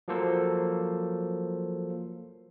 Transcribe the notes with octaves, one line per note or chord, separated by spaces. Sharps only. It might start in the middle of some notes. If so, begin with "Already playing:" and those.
F3 F#3 A#3 A4 C5